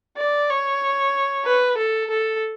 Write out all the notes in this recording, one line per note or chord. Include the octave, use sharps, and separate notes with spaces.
D5
C#5
B4
A4
A4